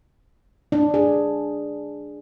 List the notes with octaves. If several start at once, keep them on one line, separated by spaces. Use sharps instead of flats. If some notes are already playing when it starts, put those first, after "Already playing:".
D4
G#4